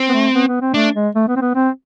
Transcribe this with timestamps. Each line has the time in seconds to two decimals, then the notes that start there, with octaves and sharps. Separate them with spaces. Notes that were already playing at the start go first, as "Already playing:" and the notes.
Already playing: C4
0.09 B3
0.13 A3
0.35 B3
0.48 B3
0.61 C4
0.74 A3 D4
0.95 G#3
1.15 A3
1.28 B3
1.36 C4
1.41 B3
1.55 C4